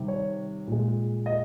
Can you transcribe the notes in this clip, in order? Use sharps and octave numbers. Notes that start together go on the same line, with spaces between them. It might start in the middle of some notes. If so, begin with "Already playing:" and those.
Already playing: C3 D#3 G3
C#5
A#2 G#3
D#5